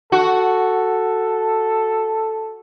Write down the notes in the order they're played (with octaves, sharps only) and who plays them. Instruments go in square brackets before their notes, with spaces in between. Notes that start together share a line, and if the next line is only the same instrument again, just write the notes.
[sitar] F#4 [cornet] A4